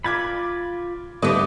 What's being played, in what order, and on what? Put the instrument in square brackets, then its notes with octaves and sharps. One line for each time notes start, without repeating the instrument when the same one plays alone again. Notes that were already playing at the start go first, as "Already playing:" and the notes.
[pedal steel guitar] F4 B5 [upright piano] D6 G#6 A6
[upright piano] D3 A3 [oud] G3 B3 [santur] D#5 D6